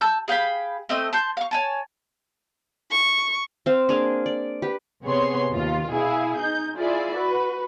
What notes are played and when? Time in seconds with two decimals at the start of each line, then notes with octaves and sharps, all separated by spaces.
0.01 A5 E6 G6
0.28 G#4 F5 G5 B5
0.89 A3 C4 D#5
1.13 A5 C6 G6
1.37 F5 C#6
1.51 C#5 G#5 A5
2.92 C#6
3.66 C4 F5
3.89 A#3 D4 G#4 F5
4.26 D5
4.62 G4 B4
5.05 C3 B3 G#4 C#5 C6
5.52 D#2 F4
5.92 B2 E4 G#4 F5
6.39 D#4 G6
6.78 E4 F4 G#4 D5 E5
7.14 F#4 B4